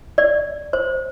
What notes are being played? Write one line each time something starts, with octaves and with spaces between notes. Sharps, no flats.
D5
C5